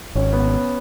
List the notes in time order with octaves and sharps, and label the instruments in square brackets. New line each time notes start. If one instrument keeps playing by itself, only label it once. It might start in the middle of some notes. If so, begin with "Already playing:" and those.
[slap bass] G#1 [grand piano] C#4
[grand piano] B3